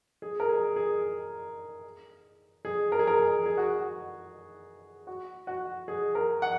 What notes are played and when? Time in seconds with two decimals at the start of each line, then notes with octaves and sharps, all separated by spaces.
0.22 G#4
0.40 A#4
0.49 G#4
0.76 G#4
2.65 G#4
2.92 A#4
2.99 G#4
3.07 A#4
3.19 G#4
3.46 G#4
3.57 F#4
3.80 F#4
5.07 F#4
5.47 F#4
5.88 G#4
6.15 A#4
6.42 F#5